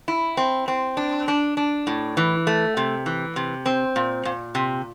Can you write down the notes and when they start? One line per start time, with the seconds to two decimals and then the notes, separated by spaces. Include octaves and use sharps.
0.08 E4
0.37 C4
0.68 C4
0.97 D4
1.28 D4
1.57 D4
1.87 A2
2.17 E3
2.47 A3
2.77 C3
3.06 E3
3.36 C3
3.66 C4
3.96 A#2
4.25 A#2
4.55 C3